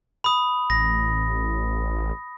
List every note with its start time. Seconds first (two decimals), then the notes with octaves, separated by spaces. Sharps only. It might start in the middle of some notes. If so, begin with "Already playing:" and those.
0.24 B5 D#6
0.70 A1 A#6